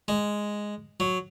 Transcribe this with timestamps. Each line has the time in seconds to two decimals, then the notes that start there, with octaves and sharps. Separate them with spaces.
0.08 G#3
1.00 F#3